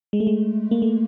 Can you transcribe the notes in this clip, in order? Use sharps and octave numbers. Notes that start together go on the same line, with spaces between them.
G#3
A3
G#3
A#3
A3